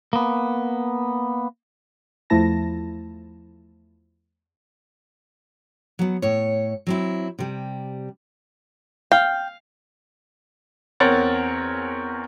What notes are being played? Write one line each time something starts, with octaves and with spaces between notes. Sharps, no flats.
A#3 B3
E2 F3 A3 E4 A5 A#6
F#3 B3
A2 C#5
F#3 C4 E4
C3 G3
F5 G5
E2 C4 A#4 C#5 F#5 A6